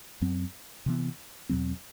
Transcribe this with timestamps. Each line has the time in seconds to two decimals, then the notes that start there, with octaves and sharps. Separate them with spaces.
0.21 F#2 F#3 C4
0.86 C3 E3 B3
1.49 E2 B2 F#3 C4